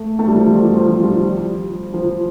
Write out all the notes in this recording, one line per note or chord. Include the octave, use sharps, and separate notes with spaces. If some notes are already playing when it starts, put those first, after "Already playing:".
Already playing: A3
A3
G3
F3 A3
F3
G3
F3
F3
G3
F3
F3